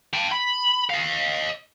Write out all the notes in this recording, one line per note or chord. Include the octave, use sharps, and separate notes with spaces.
G5 A5
B5
D#5 F5